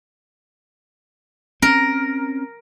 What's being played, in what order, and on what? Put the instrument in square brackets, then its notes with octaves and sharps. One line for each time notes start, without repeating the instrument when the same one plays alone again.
[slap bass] C4 C#4 [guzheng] A#4